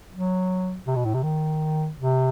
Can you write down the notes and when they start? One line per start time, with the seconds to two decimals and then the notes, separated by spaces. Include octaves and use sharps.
0.13 F#3
0.87 C3
0.96 B2
1.05 A2
1.14 C3
1.23 D#3
1.98 C3